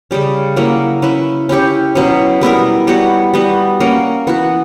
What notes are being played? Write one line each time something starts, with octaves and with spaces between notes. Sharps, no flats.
C#3 G3 C#4
F#3 A#3 C#4 E4
C#4 E4 B4
C#4 E4 G4 C#5
B2 F#3 C#4 E4
G3 B3 E4 A#4
G3 B3 F#4 C#5
G3 B3 F#4
A#3 C#4 F#4
E3 B3 F#4